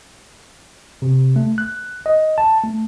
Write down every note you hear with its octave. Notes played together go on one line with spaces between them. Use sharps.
C3
A3
F#6
D#5
A5
A3